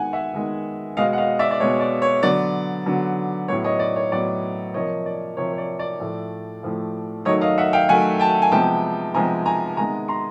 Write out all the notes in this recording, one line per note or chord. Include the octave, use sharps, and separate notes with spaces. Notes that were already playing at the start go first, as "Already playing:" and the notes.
Already playing: D#3 G#3 B3 F#5 G#5
E5 F#5
D#3 G#3 B3
B2 G#3 B3 D#5 F5
F#5
D#5 F5
D5 E5
D5
B2 G#3 B3 C#5
D5
C#5
D3 F#3 B3 D5
D3 F#3 B3
A2 F#3 B3 C#5
C#5 D#5
D5
C#5
A2 F#3 B3 D5
C3 F3 A#3 C#5 D#5
D5
C3 F3 A#3 C#5
C#5
D5
D5
A2 F3 A3
A2 F3 A3
D#3 F#3 A3 C#5 D#5
D#5 F5
E5 F#5
F5 G5
D#3 F#3 A3 F#5 G#5
G5 A5
G#5
C3 F3 G#3 B3 G5 A5
C3 F3 G#3 B3 G#5 A#5
G#5 A#5
C3 D#3 G#3 B3 G#5 A#5
A#5 C6